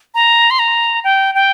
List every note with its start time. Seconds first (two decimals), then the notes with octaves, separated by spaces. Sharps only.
0.14 A#5
0.50 C6
0.59 A#5
1.04 G5
1.35 G5